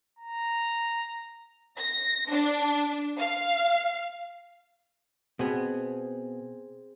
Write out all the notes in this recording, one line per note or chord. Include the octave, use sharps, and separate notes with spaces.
A#5
A#6
D4
F5
B2 B3 C4 G#4